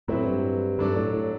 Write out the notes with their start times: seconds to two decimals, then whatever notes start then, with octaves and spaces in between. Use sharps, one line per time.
0.08 A2 F#3 C4 E4 B4
0.26 G2
0.78 G2 F#3 A3 D4 A4 D5
0.96 A2
1.13 A2